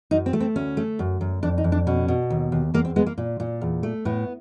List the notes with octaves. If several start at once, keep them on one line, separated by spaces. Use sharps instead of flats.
F#2 D#4
C4
A3
C4
D2 C#4
A3
F#2
F#2
F2 D4
D#4
F2
D4
B2 C#4
B2
D#2
D#2
E2 A#3
C4
G#3 B3
A#3
A#2
A#2
E2
A3
A2 B3